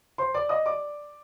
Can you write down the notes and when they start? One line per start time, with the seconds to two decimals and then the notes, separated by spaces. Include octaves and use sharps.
0.18 C5 C6
0.34 D5 D6
0.49 D#5 D#6
0.66 D5 D6